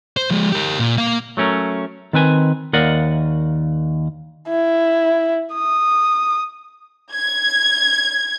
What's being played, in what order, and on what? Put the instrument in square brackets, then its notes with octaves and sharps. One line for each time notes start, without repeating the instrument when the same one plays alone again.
[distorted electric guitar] C5
F3 G#3
G4 A#4
A#2
A#3 F5
[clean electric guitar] F#3 A3 C#4 A#4
D#3 C4 B4 G#5
D#2 A#4 D5 D#5 F5 F#5
[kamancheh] E4
D#6
[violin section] G#6